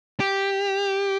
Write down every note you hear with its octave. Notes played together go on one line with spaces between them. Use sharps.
G4